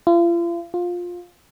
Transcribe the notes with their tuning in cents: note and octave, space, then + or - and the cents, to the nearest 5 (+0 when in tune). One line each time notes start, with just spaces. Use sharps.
F4 -40
F4 +15